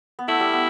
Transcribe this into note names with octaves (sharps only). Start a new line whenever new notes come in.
B3
A3 E4
G3
B3